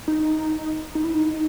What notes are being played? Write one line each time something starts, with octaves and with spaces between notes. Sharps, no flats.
D#4
D#4
E4
D#4